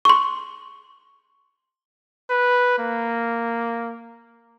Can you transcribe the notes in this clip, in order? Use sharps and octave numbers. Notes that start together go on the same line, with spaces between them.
C6 C#6
B4
A#3